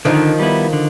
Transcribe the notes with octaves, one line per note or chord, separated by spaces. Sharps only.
D3 D#3 F3
G3 B3 E4
D3